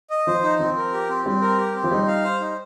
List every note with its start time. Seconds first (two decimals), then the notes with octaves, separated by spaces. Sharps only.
0.10 D#5
0.27 F3 C5
0.43 D#4
0.59 F3 C4
0.76 A#4
0.93 G4
1.09 C4
1.25 G3 C4
1.42 A#4
1.58 G4
1.75 C4
1.84 F3
1.91 G3 D#4
2.08 F5
2.24 C5
2.40 D#4